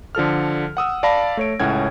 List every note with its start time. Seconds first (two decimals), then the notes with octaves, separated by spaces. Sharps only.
0.15 D3 F3 A4 F6
0.77 F#5 D#6 E6
1.03 D5 F5 A5 B5 A#6
1.37 A3 C#5 D7
1.60 C#2 A2 C#4 F#5 G#6